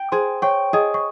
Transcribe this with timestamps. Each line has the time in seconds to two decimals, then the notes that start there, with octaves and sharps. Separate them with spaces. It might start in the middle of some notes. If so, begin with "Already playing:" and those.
Already playing: G5
0.12 G#4 C5 C6
0.42 C#5 G5 C#6
0.73 G#4 D#5 D#6
0.94 C#6